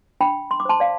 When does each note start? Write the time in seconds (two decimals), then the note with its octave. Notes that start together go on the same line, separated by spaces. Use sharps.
0.20 D4 G5 B5
0.51 C6
0.60 D6
0.65 C5 A5 C6
0.80 D5 F5